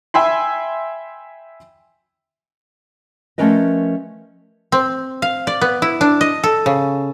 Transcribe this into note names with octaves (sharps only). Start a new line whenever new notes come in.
E5 G5 G#5 B5 C6
F3 A3 C#4 A#4 B4 D#5
C4
F5
D5
B3
E4
D4
D#5
A4
C#3